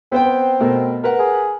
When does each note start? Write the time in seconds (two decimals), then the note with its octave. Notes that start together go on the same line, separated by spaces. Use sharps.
0.12 B3 C4 C5 G5
0.60 B2 A3 A#4
1.04 A#4 B4 F#5
1.19 G#4